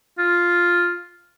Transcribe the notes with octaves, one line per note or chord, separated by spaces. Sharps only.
F4